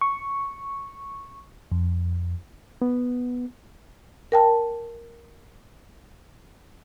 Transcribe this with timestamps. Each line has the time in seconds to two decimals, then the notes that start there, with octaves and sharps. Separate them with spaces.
0.01 C#6
1.72 F2
2.82 B3
4.32 A#4 G5 A5